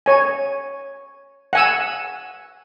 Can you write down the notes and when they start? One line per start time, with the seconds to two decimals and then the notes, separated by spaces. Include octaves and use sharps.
0.06 C#5 G#5
1.53 F#5 G#5 E6